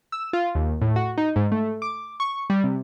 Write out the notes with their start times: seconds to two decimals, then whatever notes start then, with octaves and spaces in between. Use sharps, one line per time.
0.12 E6
0.33 F4
0.55 D#2
0.81 A2
0.96 F#4
1.18 D#4
1.36 G#2
1.52 A3
1.82 D6
2.20 C#6
2.50 G3
2.64 C3